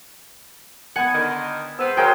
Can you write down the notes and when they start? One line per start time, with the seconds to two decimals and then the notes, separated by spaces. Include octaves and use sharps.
0.96 B3 F#5 G#5 G#6
1.14 D3 D#3
1.79 C3 G#3 B3 C5 E6
1.97 F#3 G#4 A#4 F5 G5